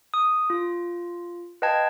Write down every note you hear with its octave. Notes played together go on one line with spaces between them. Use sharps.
D#6
F4
B4 D#5 F5 G5 A5 G#6